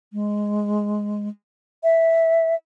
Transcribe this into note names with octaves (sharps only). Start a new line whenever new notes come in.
G#3
E5